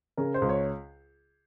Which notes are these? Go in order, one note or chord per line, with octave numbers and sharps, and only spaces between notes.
C#3 A#4
C5
C#2
C#5